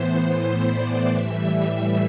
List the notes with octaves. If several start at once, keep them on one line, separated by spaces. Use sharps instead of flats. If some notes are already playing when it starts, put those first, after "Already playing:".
Already playing: A2 E3 B3 C5
C5
D5
A2 E3 G3 E5